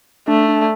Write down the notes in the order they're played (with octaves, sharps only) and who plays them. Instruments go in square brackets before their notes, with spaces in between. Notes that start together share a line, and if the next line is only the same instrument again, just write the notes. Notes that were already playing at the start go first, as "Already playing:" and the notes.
[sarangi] A3 [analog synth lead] D4
[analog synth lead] D4